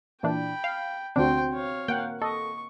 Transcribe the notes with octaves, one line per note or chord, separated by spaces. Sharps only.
A#2 E3 D4 G5 B5
F5
D2 D3 C4 D4 F#4 G5 C6
C#5 F5
A#3 F#5 G5
A4 D#5 C#6